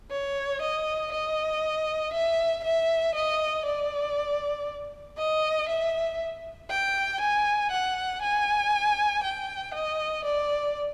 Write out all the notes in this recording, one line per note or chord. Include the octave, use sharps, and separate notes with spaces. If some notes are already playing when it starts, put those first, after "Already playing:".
C#5
D#5
D#5
E5
E5
D#5
D5
D#5
E5
G5
G#5
F#5
G#5
G5
D#5
D5